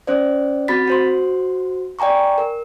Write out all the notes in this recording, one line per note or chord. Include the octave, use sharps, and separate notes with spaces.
C#4 C5 D5
C4 F#4 B5 A6 B6
F#4 C5 C6
D5 G5 G#5 A#5 C#6
A#4